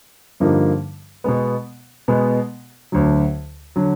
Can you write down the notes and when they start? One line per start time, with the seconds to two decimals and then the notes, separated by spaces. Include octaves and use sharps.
0.40 G2 D3 F3 A#3 D#4
1.24 B2 G#3 B3
2.08 B2 G#3 B3
2.92 D2 D3 F#3
3.76 D3 F#3